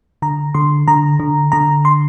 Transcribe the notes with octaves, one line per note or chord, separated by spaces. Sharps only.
D3 A#5
D3 C6
D3 A#5
D3
D3 A#5
C6